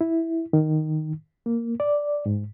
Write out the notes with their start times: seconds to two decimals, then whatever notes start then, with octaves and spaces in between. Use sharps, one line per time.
0.01 E4
0.53 D#3
1.46 A#3
1.80 D5
2.26 G#2